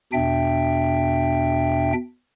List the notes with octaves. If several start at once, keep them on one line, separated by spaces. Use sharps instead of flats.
E2 B2 D4 E5 G5